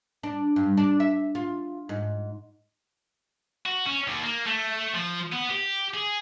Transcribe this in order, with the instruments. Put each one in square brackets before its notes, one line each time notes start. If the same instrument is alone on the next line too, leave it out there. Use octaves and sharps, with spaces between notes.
[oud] D4
G2
D4
E5
F4
G#2
[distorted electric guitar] F#4
C#4
D#2
A#3
A3
F3
B3
G4
G#4